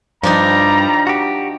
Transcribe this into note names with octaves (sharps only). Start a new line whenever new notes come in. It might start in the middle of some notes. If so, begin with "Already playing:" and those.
G2 F3 G3 D4 D#4 A#5
F#4 G4